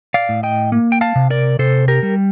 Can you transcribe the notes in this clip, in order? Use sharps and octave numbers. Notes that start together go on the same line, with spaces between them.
D5 F5
A2
D#5 G5
A#3
G5
F5 A5
C3
A#4 D5
C3 A4 C5
G4 A#4
G3